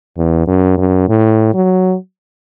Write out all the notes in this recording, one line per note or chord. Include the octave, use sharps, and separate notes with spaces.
E2
F#2
F#2
A2
F#3